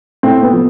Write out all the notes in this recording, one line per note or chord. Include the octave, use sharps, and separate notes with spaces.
A2 C4
B3
F3